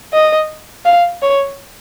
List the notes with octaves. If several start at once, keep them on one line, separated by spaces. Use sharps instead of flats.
D#5
F5
C#5